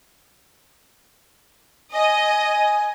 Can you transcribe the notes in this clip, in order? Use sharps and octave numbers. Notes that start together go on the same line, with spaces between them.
D#5 G#5